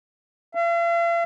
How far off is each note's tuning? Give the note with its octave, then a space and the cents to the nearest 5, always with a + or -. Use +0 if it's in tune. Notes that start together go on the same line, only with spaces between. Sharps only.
F5 -45